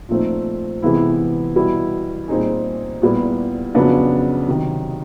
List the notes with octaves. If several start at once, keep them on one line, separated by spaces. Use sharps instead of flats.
A#2 F3 A3 C4 D#4
C3 E3 G#3 B3 E4
B2 G3 B3 E4
A#2 G3 C4 D#4 G#4
A#2 G3 B3 E4 G4
F2 C#3 F#3 B3 D4
C3 D#3 F#3